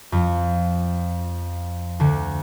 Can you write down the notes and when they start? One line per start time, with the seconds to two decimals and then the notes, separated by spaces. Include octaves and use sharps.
0.12 F2 F3
2.00 D2 D3